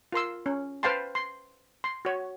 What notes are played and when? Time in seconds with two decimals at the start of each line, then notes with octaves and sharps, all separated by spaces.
0.12 F4 A#4 C6 E6
0.46 C#4
0.83 B4 C5 F5 G5 A5 C6
1.15 C6
1.84 C6
2.05 F#4 C#5